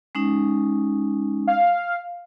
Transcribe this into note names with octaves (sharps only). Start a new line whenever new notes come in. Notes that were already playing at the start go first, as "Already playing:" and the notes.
G#3 C#4 D#4
F5